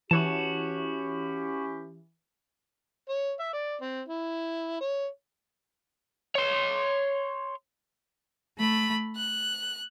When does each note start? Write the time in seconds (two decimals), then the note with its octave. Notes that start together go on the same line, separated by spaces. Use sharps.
0.11 E3 C#4 E4 F#4 G4 C#5 A5
3.09 C#5
3.39 E5
3.53 D5
3.81 C4
4.08 E4
4.80 C#5
6.35 C#5 C6
8.58 A3 B5
9.15 F#6